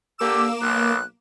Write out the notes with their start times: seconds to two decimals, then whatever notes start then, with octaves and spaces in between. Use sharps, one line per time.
0.19 D3 A#3 G4 D6 E6 E7
0.61 B1 F#6